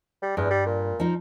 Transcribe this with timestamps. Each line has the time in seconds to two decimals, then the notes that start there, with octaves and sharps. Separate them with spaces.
0.22 G3
0.37 E2 G2
0.50 G3
0.66 A#2
1.00 F3 D#4